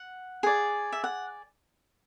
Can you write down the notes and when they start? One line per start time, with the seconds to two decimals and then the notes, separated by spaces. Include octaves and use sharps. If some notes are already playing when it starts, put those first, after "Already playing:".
Already playing: F#5
0.43 G#4 D5
0.92 E5
1.04 F#5